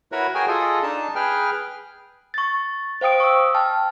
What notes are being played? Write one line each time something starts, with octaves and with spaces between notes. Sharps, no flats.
E4 F#4 A#4 B4 C#5
F#4 G#4 A#4 G5 G#5
F4 G#4 A4 D#5
D4 D#4 A5
G#4 B4 G5 F6
C#6 A6
C5 F5 G5 D#6 D7
C#6 E6
G5 A5 F6